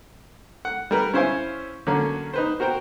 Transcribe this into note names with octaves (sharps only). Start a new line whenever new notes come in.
F#5
G3 A#4 B4
C#4 E4 C5 C#5 F5 G#5
D3 F#3 A#3 C#4
D#4 B4 C5
F#4 A#4 C5 G5